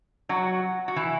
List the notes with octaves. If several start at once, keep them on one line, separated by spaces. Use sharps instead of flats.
F#3 F#4
F#4
E3 E4